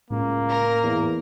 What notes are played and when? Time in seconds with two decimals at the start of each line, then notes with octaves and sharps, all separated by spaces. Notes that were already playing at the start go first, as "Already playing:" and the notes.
0.10 C#2 A2 A#3
0.49 A#4
0.83 E2